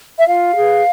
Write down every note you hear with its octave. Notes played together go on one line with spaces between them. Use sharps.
E5
F4 F5
G#4 B4